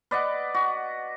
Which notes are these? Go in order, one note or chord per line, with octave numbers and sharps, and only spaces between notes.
B4 D5 D#5 F#5
F#4